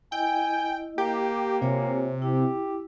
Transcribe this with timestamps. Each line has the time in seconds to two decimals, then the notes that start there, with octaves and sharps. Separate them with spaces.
0.12 E4 D#5 G5 G#5
0.98 A#3 G4
1.61 C3 F4 C#5 G#5
2.22 E4 G4